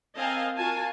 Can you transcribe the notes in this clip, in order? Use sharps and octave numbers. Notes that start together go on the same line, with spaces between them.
C4 A#4 D#5 F5 G#5 A5
F4 F#4 A#4 G#5 A5